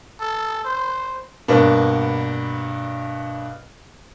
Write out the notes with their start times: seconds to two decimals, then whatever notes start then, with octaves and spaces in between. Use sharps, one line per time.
0.20 A4
0.65 C5
1.48 G2 B2 A#3 B3 D4